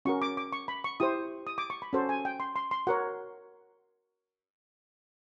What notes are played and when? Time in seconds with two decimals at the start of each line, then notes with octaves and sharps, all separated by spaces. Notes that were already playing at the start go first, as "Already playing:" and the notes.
0.05 C#4 F#4 A#4 C#6
0.22 D6
0.37 D6
0.53 C#6
0.68 B5
0.84 C#6
1.00 E4 G4 C5 D#6
1.47 D#6
1.58 D6
1.70 C#6
1.82 B5
1.93 C#4 F#4 A4 C5
2.09 G#5
2.25 G5
2.40 C6
2.56 C6
2.71 C6
2.87 F#4 A#4 C#5 F#5